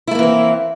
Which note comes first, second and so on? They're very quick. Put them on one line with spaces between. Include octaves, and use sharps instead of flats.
E4 A3 A#3 E3 C4